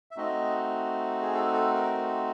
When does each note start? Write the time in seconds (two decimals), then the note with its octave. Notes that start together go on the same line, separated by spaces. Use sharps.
0.11 E5
0.17 A3 C4 D#4 F#4 D#5
1.22 G#4
1.34 A4
1.53 A4
1.74 A#4